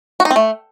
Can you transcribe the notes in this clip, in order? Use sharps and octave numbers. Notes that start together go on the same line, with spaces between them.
F#4
D#4
C4
A3